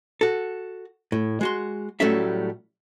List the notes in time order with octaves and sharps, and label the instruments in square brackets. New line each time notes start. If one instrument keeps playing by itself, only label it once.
[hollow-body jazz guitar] F#4 A4
A2
G#3 F#4 C6
A2 F#3 G3 A3 C#4 E5